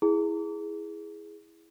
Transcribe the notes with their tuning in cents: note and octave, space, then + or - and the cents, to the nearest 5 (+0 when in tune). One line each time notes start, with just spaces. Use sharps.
E4 +0 G#4 +0